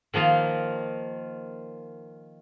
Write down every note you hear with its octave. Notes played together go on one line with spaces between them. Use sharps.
D#3 F3 A#3 D#4 F4